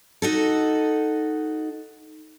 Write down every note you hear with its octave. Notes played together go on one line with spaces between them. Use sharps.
D#4 F#4 A4